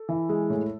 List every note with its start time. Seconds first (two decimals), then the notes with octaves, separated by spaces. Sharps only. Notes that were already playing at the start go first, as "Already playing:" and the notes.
Already playing: A4
0.09 E3
0.29 G#3
0.50 A2